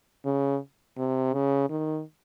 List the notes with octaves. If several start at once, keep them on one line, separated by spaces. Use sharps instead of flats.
C#3
C3
C#3
D#3